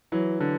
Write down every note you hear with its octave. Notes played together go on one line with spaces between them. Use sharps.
E3 F#3
D3 E3